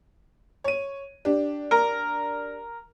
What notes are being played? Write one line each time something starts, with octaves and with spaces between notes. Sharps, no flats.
C#5 D#7
D4 G4
A#4